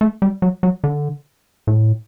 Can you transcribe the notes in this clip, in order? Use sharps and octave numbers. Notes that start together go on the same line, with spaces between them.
A3
G3
F#3
F#3
D3
A2